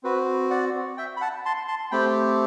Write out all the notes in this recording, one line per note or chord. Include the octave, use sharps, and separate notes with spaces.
C4 F#4 B4
D5 F#5
E5 G5
B5
F#5 A5
A5 C6
A5 C6
A3 C4 G4 G5 B5